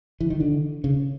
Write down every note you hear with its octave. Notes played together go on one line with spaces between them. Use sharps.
E3
D#3
D3
C#3